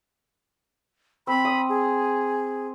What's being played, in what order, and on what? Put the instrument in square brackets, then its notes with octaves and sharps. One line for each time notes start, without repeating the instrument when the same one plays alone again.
[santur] C4 [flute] B5
[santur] D#6
[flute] G#4